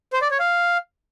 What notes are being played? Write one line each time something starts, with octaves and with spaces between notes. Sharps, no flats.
C5
D5
C#5
F5